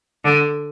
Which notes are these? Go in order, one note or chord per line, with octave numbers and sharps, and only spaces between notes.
D3